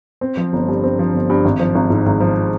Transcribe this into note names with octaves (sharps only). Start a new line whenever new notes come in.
C4
F3
G1
G2
C4
F3
G1
G2
G#1
F3
G#1
G#2
G#1
F3